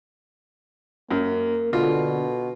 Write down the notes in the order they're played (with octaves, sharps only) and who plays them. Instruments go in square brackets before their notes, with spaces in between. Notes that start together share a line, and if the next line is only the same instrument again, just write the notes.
[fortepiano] F#2 [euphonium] A#3
[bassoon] B2 [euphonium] D3 [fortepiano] F4